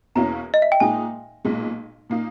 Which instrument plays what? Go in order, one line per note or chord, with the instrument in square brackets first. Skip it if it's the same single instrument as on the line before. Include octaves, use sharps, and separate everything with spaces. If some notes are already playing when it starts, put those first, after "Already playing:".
[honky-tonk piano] E2 B2 A#3 C#4 E4 [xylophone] A#5
[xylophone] D#5
E5
G5
[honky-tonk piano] A#2 G#3 D#4 [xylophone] G#5
[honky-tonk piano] B1 A#2 G#3
A#2 A#3 D#4